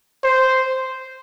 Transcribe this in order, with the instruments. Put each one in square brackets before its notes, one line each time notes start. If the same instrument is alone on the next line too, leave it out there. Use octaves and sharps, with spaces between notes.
[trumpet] C5